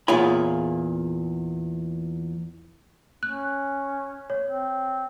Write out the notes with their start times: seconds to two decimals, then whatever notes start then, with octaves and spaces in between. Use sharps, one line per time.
0.08 E2 A#2 F4 G#4 C#5 B5
3.23 C#4 F#6
4.30 C#5
4.44 C4